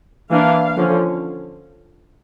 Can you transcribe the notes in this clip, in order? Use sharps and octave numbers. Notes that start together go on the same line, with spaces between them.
E3 A#3 D4 F5
D3 F3 C#4